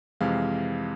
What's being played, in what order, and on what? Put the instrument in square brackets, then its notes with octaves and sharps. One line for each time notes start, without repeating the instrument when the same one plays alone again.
[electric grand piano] F2 C3 E3 G#3 F5